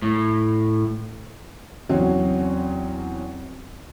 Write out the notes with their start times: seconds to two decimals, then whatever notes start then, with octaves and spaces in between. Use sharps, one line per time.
0.02 A2
1.89 E2 C#3 F#3 C4 C#4